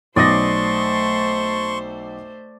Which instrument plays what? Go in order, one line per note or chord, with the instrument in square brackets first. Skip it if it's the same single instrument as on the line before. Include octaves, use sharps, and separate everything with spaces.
[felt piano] B1 D#6 A#6 [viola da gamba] A3 C5 [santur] D5 [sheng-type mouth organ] C6 C#6